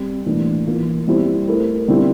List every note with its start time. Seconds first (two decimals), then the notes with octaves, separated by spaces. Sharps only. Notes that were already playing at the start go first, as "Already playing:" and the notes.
Already playing: G3 C4 G4
0.26 A2 E3 A#3 D4
0.67 E3 A#3 F4
1.08 G3 C4 E4 G4 C5
1.48 A3 E4 A#4
1.88 D3 G3 C4 E4